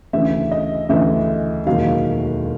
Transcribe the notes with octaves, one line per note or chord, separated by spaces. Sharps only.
D2 C#3 E3 E5
D#5
D2 C#3 E3 E5
E1 D#2 D#3 F#3 F5